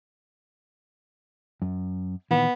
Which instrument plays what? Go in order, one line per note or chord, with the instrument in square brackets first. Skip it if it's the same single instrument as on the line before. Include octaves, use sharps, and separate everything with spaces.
[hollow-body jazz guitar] F#2
[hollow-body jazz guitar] A#2 D#3 E3 [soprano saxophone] B3